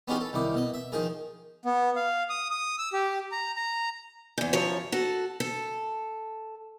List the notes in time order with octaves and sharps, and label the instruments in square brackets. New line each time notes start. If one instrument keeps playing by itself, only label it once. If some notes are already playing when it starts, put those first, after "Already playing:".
[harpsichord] B3 C#4 D#4 F4 G4 G#4
A4
C2 D#3 E4 D6
B2 D#5
E5
D#3 F3 G#4 A#4
[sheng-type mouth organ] B3
F5
D#6
D#6
E6
G4
A#5
A#5
[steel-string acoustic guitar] E2 G#2
F#2 F3 C#5
F#4 A4
A4